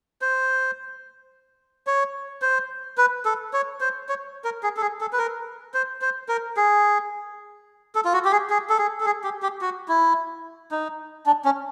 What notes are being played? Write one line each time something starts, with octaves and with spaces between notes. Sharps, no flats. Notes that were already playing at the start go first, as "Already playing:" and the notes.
C5
C#5
C5
B4
A4
C#5
C5
C#5
A#4
G#4
A4
G#4
A4
B4
A#4
C5
C5
A#4
G#4
A4
F4
F#4
G4
G#4
G#4
A4
G#4
A4
G#4
G4
G4
F#4
E4
D#4
D4
C#4